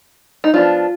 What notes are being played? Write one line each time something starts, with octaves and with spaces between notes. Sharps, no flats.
D#4
F3 B3 D4 F4